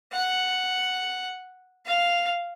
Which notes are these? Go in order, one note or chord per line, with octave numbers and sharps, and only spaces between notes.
F#5
F5